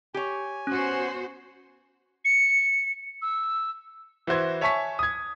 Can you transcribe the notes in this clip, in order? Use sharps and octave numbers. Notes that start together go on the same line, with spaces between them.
G4 C#5 G#5
B3 C#4 F#4 C5
C#7
E6
E3 E4 F#4 C5 G#6
C#5 E5 G#5 A5 C#6 B6
D#6 G#6